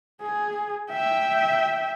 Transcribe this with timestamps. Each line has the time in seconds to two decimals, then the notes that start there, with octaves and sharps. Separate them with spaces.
0.22 G#4
0.91 E5 G5